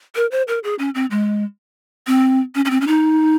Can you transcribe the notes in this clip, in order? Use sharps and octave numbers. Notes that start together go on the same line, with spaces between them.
A#4
C5
A#4
G#4
C#4
C4
G#3
C4
C#4
C#4
C4
C#4
D#4